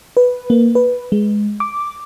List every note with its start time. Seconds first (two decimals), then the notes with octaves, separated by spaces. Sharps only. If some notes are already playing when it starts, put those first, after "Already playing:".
0.17 B4
0.50 A#3
0.75 B4
1.12 G#3
1.60 D6